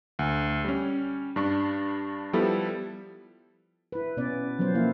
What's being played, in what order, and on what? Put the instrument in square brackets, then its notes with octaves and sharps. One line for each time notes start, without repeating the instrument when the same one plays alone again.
[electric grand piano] D2
G3 C#4
G2 D4 C#6
F3 G3 B3 E4 A4
[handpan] E4 B4
B2 B3 C#4 D5
F3 F#3 B3 C#4 C5
F3 A#3 E4 F5